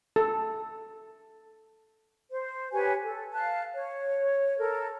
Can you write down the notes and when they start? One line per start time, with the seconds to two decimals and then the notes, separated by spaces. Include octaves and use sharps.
0.16 A4
2.30 C5
2.72 G4 B4 C#5 G#5
3.03 A4
3.33 F5 A5 F#6
3.75 C#5
4.58 A4 A#4